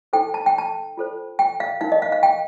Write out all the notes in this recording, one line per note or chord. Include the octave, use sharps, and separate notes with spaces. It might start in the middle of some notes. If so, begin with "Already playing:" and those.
D#4 A4 C5 G5
A5
G5
A5
F4 A4 C5
G5
F5
D#4 A#4 F5
D#5
F5
F5
G5